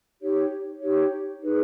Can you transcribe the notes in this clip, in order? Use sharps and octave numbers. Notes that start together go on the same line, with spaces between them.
D#4 G4 C#5
D#4 G4 C#5
D#4 G#4 B4